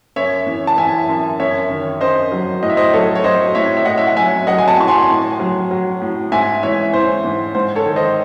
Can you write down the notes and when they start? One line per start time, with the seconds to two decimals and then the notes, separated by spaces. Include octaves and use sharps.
0.16 F#2 C#5 E5
0.46 E3
0.67 A5
0.78 E3 E5 G#5
1.09 F#2
1.39 F#2 C#5 E5
1.70 D#3
2.01 F#2 C5 D#5
2.32 F#3
2.62 A2 D#5
2.70 E5
2.77 C5 D#5
2.93 F#3 A4 C#5
3.15 C#5
3.24 F#3 C5 D#5
3.55 A2 C#5 E5
3.77 E5
3.85 A2 D#5 F#5
3.98 E5
4.07 F#5
4.16 F#3 E5 G#5
4.47 F#3 D#5 F#5
4.59 G#5
4.68 F#5 A5
4.78 A2 C#6
4.88 G#5 C6
5.09 A2
5.39 F#3
5.71 F#3
6.01 A2
6.32 G#2 E5 G#5
6.63 E3 C#5 E5
6.93 E3 C5
7.24 G#2
7.55 G#2 C5
7.76 A4 C#5
7.86 D#3
7.96 C5 D#5